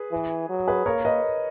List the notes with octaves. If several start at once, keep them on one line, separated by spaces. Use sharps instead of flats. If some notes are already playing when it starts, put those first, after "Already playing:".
Already playing: G#4 B4
E3
F#3
G#4 B4
A#3 A#4 C#5
B4 D#5